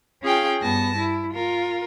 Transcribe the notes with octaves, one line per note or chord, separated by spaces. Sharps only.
C#4 F4 G#4 F5 G5
G2 B3 A5 A#6
E4
F4 A#4